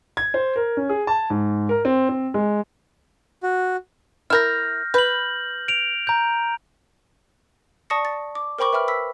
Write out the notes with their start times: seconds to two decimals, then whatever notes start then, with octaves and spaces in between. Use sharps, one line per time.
0.17 G#6
0.34 C5
0.56 A#4
0.77 C#4
0.89 G#4
1.07 A5
1.30 G#2
1.69 A#4
1.85 C4
2.09 C4
2.34 G#3
3.43 F#4
4.30 E4 A#4 F6 G6 A#6
4.94 B4 G6 F#7
5.68 D7 F7
6.07 A#5 G6
7.90 D5 A5 C#6 D#6 A#6 C#7
8.05 A6
8.35 D6
8.59 A#4 C5 G5 B5 C#6 D6
8.73 B4 E5 G5 B5 F6
8.88 B5 E6 B6